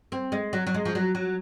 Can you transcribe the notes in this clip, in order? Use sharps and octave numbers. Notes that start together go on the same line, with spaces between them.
C4
G#3
F#3
F#3
G#3
F3
F#3
F#3